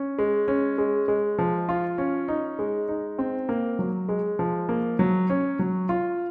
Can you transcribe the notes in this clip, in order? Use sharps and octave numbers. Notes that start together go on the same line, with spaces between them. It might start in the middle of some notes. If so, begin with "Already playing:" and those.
Already playing: C#4
G#3
C#4
G#3
G#3
F3
F4
C#4
D#4
G#3
D#4
C4
A#3
F#3
G#3
F3
A#3
F#3
C#4
F#3
F4